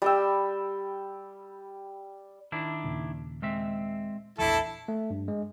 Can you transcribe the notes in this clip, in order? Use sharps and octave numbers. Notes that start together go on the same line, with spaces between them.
G3 G5 E6
D#3 D4 E4
D#2 A#2 C#3
G#3 C4 E5
A#1 E2 E3 A3 D4 E4 A4
A3
G2
G#3